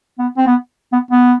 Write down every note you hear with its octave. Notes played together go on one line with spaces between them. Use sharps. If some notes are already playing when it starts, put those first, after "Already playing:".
B3
C4
B3
B3
B3